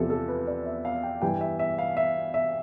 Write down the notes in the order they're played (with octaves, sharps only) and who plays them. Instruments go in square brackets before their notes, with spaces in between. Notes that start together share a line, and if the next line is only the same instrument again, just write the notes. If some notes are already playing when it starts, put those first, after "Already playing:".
Already playing: [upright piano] E2 C3 F3 A4
A4
B4
D5
E5
F5
G5
G2 E3 G3 G5
E5
E5
F5
E5
E5